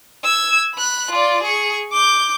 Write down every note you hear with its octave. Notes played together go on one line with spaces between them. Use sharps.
E6 G#6
B5 F#6
F4 D5
G#4 C#6
D6 G6